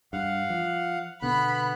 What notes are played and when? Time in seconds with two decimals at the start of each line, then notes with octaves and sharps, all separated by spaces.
0.13 G2 F5 F#5
0.50 F3
1.22 B2 D3 B3 B5 F#6